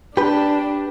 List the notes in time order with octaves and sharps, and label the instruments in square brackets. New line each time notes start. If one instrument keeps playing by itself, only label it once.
[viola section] D4 [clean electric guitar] G4 B4